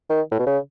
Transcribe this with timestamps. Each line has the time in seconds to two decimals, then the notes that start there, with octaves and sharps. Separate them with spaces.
0.10 D#3
0.31 A2
0.39 B2
0.47 C#3